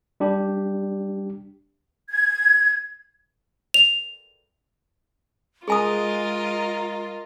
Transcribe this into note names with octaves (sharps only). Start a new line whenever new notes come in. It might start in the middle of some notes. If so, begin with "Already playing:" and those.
G3 D4 G4
G#6
F7
G#3 F4 G#4 A#4 D#5 G#5 D#6